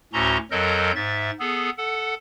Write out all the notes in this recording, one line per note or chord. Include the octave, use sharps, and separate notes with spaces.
D2 A2 C#4 F#4 A#5 C6
F2 F#3 A4 A#4 D#5 G6
G#2 E5 A6
B3 G#4 A4
A4 F#5